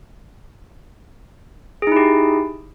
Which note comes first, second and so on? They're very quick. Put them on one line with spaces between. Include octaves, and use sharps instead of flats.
G#4 D#4 E4 G4